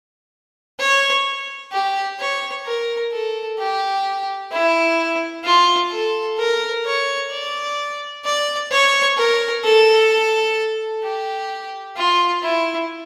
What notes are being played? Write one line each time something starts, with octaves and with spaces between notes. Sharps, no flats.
C#5
G4
C#5
A#4
A4
G4
E4
F4
A4
A#4
C#5
D5
D5
C#5
A#4
A4
G4
F4
E4